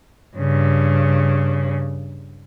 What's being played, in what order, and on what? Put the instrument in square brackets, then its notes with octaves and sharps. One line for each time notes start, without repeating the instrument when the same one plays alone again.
[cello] G2 C#3